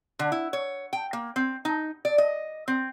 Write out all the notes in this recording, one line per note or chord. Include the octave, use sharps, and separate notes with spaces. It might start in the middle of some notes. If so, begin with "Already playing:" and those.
D3
E4
C#5
G5
A#3
C4
D#4
D5
D#5
C4